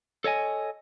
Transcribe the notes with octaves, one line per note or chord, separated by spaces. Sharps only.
A4 C#5 D#5 G#5